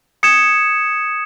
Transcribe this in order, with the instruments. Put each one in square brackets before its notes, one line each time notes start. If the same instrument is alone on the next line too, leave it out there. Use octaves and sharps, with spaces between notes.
[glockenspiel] D#6 G#6 C#7 E7